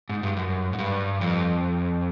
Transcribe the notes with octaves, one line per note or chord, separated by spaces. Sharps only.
G#2
G2
F#2
G#2
G2
F2